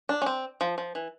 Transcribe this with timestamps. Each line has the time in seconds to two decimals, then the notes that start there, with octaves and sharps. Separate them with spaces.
0.09 D4
0.22 C#4
0.26 C4
0.61 F3
0.78 F3
0.95 E3